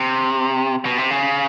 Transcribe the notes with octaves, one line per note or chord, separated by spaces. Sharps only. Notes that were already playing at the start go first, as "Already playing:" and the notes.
Already playing: C3
B2
C3
C#3